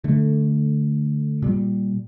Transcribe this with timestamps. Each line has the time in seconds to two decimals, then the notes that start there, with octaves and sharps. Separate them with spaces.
0.04 D3 A3
1.42 A#2 G3